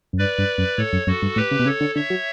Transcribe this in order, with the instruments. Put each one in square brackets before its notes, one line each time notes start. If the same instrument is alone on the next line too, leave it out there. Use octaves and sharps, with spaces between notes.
[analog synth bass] F#2
[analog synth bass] G2 [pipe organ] B4 D5
[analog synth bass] G2
F#2
[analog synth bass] A2 [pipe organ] A4 C#5
[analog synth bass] F#2
[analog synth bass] F#2 [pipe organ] F#4 A4
[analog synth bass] G2
[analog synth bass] A2 [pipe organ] G4 B4
[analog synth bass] C#3
B2
[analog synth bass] C#3 [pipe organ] A4 C#5
[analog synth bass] D3
[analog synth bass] D3 [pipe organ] C#5 E5
[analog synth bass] F#3